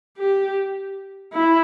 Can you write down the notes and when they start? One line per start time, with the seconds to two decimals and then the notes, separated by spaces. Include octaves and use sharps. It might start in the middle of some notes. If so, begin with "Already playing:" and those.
0.18 G4
1.33 E4